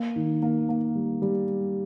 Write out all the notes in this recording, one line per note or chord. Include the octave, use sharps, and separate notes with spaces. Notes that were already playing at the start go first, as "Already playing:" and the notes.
Already playing: A#3
D#3
A#3
A#3
G3
G3